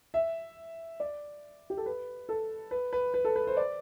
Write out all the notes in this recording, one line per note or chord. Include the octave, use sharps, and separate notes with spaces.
E5
D5
G4
A4
B4
A4
B4
B4
B4
A4
B4
C5
D5